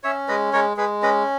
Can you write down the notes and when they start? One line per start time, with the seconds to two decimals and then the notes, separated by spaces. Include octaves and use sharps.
0.03 C#4 C#5 E5
0.28 G#3 B4 D#5
0.53 G#3 A#4 C#5
0.77 G#3 G#4 B4
1.02 C#4 B4 D#5